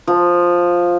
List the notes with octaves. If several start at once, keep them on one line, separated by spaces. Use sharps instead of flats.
F3